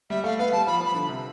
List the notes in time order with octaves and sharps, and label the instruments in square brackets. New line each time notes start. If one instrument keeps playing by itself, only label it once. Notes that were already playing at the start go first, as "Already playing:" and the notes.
[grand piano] G3 [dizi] E5
[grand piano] A3 [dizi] F5
[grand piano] B3 [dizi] F5
[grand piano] G3 [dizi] A5
[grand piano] F3 [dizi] B5
[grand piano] F3 [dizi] B5
[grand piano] D3
C3